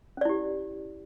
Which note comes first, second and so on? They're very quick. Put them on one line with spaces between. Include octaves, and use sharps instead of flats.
C#4 D5 E4 G4